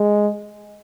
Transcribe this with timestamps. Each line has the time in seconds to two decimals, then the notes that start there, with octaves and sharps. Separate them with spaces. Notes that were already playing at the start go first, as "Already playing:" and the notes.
Already playing: G#3